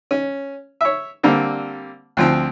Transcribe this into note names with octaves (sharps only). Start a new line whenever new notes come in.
C#4
C#5 E5
D3 G3 A#3 C4
D2 F3 C4